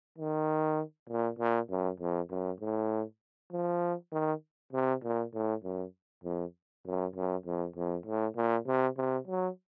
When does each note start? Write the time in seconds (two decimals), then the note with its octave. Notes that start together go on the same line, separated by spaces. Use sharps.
0.18 D#3
1.09 A#2
1.39 A#2
1.69 F#2
2.00 F2
2.30 F#2
2.60 A2
3.52 F3
4.12 D#3
4.73 C3
5.03 A#2
5.33 A2
5.64 F#2
6.24 F2
6.85 F#2
7.15 F#2
7.45 F2
7.76 F2
8.06 A2
8.36 A#2
8.67 C3
8.97 C3
9.27 F#3